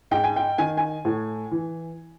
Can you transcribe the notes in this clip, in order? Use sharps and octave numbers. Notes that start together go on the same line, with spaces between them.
G#2 G5
G#5
G5
D#3 G#5
G#5
A2
E3